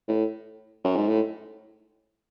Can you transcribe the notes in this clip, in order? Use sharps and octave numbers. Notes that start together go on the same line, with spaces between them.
A2
F#2
G#2
A2